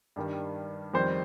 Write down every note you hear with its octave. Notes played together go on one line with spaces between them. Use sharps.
G2 D#3 G3
F2 D#3 G3 C5